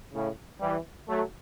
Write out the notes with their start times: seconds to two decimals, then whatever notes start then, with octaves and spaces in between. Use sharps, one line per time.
0.14 A2 C#3
0.61 E3 G3
1.08 F#3 A3